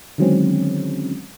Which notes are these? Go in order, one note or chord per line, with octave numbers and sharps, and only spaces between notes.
D3 D#3 F#3 G#3 C4 C#4